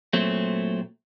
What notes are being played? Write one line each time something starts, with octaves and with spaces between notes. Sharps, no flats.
A#2 F#3 A3 C4